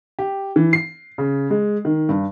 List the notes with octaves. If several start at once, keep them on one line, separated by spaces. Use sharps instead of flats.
G4
E3
C7
C#3
G#3
D#3
G2